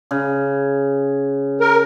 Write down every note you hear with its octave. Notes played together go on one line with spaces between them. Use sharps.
C#3
A#4